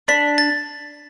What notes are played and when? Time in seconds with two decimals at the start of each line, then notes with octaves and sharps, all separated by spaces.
0.08 D4 B6
0.38 A6